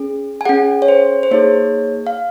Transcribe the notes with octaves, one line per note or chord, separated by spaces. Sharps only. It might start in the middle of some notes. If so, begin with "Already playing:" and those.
Already playing: C#4 G#4
G#5
C#4 G#4 F#5
C#5
C5
C5
A#3 D#4 G#4 C#5
F5